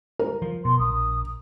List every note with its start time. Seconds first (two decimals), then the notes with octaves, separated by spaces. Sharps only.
0.19 A#4
0.42 F3
0.65 B2 C6
0.79 A#1 D#6